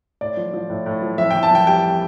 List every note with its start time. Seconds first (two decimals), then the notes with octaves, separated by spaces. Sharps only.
0.21 A2 D5
0.37 F3
0.53 F3
0.70 A2
0.86 A2
1.02 F3
1.18 F2 E5
1.31 E3 G5
1.43 A5
1.51 F2 G5
1.67 G3 G5